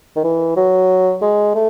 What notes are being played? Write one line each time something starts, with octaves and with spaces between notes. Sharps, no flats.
D#3
E3
F#3
G#3
A3